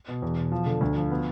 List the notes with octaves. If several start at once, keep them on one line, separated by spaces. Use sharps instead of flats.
B2
E2
B2
F3
D3
D2
F3
B3